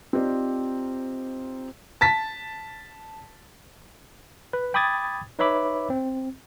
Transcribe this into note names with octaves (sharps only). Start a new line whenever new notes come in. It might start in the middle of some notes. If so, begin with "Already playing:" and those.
C4 D#4 F4 G4 C5 D5
A5 A6 B6
B4
G5 B5 D6 D#6 G#6 A6
D#4 B4 C#5 E5 B5 D6
C4